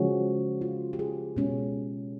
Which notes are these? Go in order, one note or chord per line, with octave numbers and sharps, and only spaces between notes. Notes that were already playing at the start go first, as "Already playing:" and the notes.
Already playing: C#3 F3 G#3 C#4 F#4
F4
G4
G#4
B2 G#3 C#4